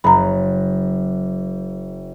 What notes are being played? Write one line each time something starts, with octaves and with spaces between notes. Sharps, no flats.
F#1 A#5 B5